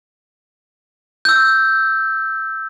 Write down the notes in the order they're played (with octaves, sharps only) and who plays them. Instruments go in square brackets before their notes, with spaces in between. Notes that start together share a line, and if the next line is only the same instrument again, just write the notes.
[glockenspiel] E6 G6